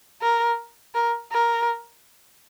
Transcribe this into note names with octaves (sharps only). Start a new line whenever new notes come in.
A#4
A#4
A#4